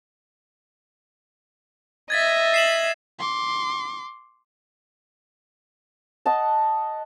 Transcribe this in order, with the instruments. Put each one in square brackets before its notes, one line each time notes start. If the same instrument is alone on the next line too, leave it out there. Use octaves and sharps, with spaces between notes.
[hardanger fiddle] D#5 E5 [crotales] G#6 A6 B6
[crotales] C7 E7 F#7
[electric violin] C6 D6
[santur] D#5 F#5 A5